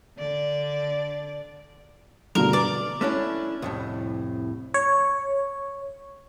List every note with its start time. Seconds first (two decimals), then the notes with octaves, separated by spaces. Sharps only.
0.17 D3 D5
2.35 G2 B2 D3 A#4
2.53 B4 D5
3.01 A3 C#4 D4 E4
3.62 C2 F2 A2
4.74 C#5